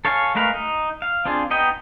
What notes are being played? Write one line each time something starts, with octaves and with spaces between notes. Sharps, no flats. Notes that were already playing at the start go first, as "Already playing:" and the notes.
A4 C#5 F5 G#5
G#3 A3 A#4 B4 F5
D#4
F5
C4 D4 F4 G#4
B3 D#4 D#5 G5